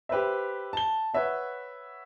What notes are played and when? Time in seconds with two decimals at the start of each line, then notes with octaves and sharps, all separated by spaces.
0.09 G4 B4 C5 E5
0.73 A5 G7
1.14 B4 C#5 E5 F#5